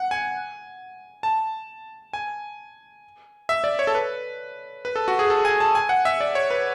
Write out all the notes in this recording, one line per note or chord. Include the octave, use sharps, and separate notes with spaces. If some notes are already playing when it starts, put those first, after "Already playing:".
Already playing: F#5
G#5
A5
G#5
E5
D5
C#5
A4
B4
B4
A4
F#4
G#4
A4
G#5
A5
G#5
F#5
E5
D5
C#5
B4